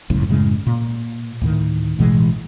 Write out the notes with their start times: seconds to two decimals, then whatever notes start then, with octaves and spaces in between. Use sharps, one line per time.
0.10 G1 C#2 F#2 A2
0.29 F#2 A2 C#3 G#3
0.67 A#2
1.41 D2 A2 D#3
1.99 A1 B2 E3 G#3